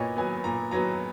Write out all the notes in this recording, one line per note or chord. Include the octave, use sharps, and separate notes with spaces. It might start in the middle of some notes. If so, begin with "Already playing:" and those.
Already playing: A#2 B3 C#5 D#5
F#3 B3 G#5
A#2 A#5
F#3 B3 A#5